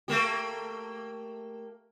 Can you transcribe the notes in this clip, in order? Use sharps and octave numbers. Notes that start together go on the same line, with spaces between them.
A3 A#3 G4